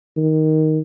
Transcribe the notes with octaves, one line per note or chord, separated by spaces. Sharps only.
D#3